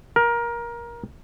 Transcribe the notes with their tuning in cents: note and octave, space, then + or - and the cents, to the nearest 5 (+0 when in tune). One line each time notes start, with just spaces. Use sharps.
A#4 +20